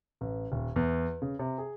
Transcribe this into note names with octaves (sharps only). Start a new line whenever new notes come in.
A1
D#1
E2
C#3
C3
G#4